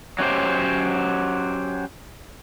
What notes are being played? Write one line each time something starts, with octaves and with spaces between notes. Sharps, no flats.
F#3 C#4 G4 C5